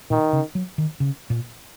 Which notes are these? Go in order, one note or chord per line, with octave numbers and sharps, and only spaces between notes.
A#2 D#3
C#3
F#3
D#3
C#3
A#2